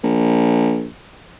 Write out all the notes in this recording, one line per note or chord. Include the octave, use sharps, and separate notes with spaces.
A#1